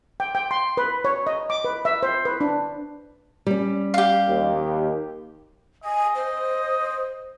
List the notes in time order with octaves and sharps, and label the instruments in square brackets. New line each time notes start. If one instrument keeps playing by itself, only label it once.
[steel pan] G5
G5
C6
B4
C#5
D#5
D6
B4
E5
C5
B4
D4
[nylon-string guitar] G3 C#4
[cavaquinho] G4 F5
[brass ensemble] D#2
[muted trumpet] D#5 [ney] G#5
[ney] C5